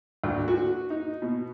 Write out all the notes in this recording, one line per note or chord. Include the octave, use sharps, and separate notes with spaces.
D2
F#4
D#4
B2